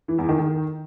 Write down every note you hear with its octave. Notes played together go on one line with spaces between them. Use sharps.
E3
E2
D#3
D#3